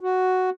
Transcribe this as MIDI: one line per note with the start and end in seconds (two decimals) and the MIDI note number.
0.01 0.50 66